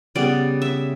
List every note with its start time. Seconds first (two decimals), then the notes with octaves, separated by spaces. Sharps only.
0.15 C#3 G3 B3 D5
0.62 E5